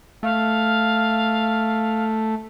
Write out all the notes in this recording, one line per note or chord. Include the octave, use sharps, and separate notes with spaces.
A3 F5